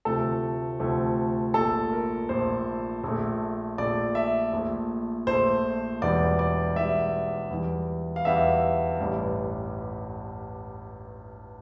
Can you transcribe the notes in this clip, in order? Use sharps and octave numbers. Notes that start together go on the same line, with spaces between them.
D2 C3 F3 A3 A4
D2 C3 F3 A3
A#1 A#2 A3 A4
A#4
A#1 A#2 A3 C5
A#1 A#2 A3
A#1 A#2 A3 D5
E5
A#1 A#2 A3
A#1 A#2 A3 C5
E1 E2 E3 G3 D5
D5
E1 E2 E3 G3 E5
E2 E3 G3
F5
E2 E3 G3 E5
A1 G2 E3 G3